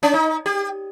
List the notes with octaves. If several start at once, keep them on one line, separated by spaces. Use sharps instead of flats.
C#4
D#4
G4